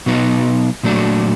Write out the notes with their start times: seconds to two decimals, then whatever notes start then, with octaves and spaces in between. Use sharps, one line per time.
0.06 B2 F#3 B3 D#4
0.83 A#2 F#3 A3 D4 F#4